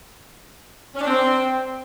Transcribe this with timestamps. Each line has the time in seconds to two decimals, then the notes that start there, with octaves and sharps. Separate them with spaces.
0.95 C#4
1.01 D4
1.07 C4